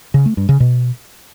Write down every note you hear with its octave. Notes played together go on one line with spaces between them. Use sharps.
C#3
A3
G2
C#3
B2